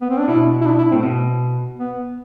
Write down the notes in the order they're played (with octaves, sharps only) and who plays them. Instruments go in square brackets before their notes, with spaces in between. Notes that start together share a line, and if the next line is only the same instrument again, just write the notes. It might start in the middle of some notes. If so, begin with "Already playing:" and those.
[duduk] B3
C4
D4
[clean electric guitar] B2 [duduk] E4
[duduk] E4
D4
E4
[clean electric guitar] A2 [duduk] C4
[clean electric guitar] B2
[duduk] B3